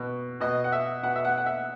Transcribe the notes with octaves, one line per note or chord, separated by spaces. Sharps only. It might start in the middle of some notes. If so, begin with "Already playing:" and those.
Already playing: B2
B2 D#5
F#5
E5
B2 F#5
E5
F#5
F#5
E5